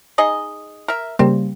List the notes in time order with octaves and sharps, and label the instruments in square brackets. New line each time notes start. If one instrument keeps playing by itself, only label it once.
[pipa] D#4 G#4 D#5
A#4 E5
[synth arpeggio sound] C#3 G3 A#3 [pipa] C4